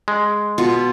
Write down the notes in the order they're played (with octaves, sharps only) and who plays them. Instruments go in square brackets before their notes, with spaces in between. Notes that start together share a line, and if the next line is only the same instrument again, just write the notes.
[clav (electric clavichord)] G#3
[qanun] B2 F4 C#6